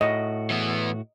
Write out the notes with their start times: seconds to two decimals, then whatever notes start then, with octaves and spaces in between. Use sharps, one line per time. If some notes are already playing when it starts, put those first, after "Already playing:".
0.01 A2 F#4 D#5
0.50 E3 B3